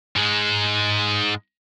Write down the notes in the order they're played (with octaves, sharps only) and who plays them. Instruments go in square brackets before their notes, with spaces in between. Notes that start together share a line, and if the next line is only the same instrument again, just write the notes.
[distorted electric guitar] G#2 G#3